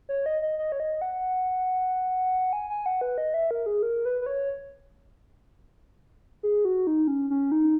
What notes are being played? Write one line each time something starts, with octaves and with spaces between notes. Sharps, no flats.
C#5
D#5
D#5
D#5
C#5
D#5
F#5
G#5
G#5
F#5
B4
D#5
E5
A#4
G#4
A#4
B4
B4
C#5
G#4
F#4
D#4
C#4
C#4
D#4